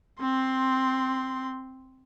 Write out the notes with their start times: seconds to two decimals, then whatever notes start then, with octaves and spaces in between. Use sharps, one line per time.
0.21 C4 C6